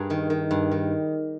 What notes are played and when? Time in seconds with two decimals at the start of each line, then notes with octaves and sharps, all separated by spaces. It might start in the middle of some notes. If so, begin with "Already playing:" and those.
Already playing: G2 G#4 A#4
0.10 D#3
0.30 D#3
0.51 G2
0.71 D#3